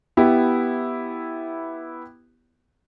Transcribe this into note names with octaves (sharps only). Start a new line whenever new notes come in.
B3 E4 G4